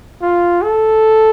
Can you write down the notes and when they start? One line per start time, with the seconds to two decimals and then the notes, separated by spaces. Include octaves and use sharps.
0.22 F4
0.63 A4